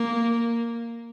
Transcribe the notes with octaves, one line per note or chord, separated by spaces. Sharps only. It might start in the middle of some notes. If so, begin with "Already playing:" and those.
Already playing: A#3